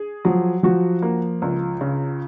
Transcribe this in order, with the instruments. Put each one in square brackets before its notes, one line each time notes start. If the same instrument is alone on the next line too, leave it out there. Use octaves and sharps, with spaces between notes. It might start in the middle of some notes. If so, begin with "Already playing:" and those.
Already playing: [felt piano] G#4
[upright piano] F3 [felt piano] F#3
[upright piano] F3 [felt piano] F#4
[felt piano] A#3
C#2
C#3